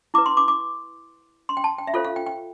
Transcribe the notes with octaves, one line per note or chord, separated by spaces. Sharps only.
E4 B4 D6
C6
D6
D6
C6
G5
A5
G5
E5
F4 A4 C5 F5
F5
G5
G5